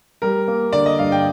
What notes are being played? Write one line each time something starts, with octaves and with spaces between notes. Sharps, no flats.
G3 A#4
A#3
D3 D5
D#5
G2 F5
G5